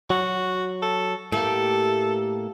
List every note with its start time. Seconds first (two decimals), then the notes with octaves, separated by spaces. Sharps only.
0.10 F#3 F#4
0.83 A4
1.32 A2 A3 A#3 G4 A4